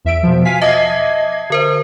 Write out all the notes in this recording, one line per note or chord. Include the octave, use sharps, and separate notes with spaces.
E2 E5 D7
B2 F3
F5 G#5 B6
D#5 E5 A5 D6 G#6 C7
D3 A#4 C5